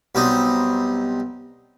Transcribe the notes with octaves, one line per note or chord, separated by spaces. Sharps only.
B1 G3 C4 D#4